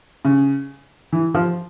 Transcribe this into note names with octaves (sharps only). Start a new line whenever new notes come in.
C#3
E3
F3